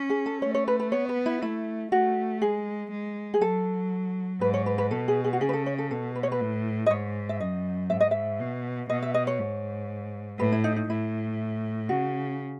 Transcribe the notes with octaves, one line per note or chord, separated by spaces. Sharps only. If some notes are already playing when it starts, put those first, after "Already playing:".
Already playing: C#4
G#4
A4
A3 C#5
C#5
B4
B4
B3 C#5
B4
E4
A3 E4
A3 F#4
G#3 G#4
G#3
G#4
F#3 A4
G#2 B4
C#5
B4
B4
B2 A4
G#4
G#4
F#4
C#3 G#4
B4
A4
C#5
A4
B2 A4
B4
C#5
B4
A2
D#5
G#2 C#5
E5
F#2 D#5
G#2 E5
D#5
E5
B2
B2 D#5
E5
D#5
C#5
G#2
A2 B4
E4
D#4
D#4
A2 E4
C#3 F#4